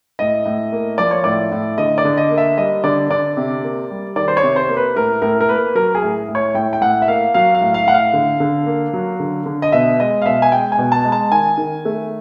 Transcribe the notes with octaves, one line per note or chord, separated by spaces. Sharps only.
A2 D#5
A2
A#3
F3 D5
C#5
A2 D5
A2
D3 D#5
D5
D3
D#5
A#3
E5
G3 D#5
D3 D5
D3 D5
C3
A#3
G3
D#3 D5
C5
C#5
C3
C5
A#3
B4
A2 A#4
A2 A#4
A#4
A#3 B4
F#3 A#4
G#4
A2
A2
C#5
A2 G5
G5
A2 F#5
E5
A#3 F5
F#3 F5
F5
A2
F5
A2 F#5
F5
D3
D3
A#3
F#3
D3
D3
D#5
B2 E5
G#3 D#5
F5
B2 E5
G#5
G#3 G5
G#5
B2
A5
G#3
A5
D#3 G#5
D#3
A3